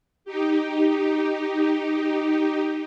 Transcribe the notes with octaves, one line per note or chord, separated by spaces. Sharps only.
D#4 G4